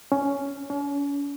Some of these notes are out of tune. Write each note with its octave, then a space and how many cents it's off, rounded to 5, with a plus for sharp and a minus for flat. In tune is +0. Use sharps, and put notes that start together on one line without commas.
C#4 +10
C#4 +40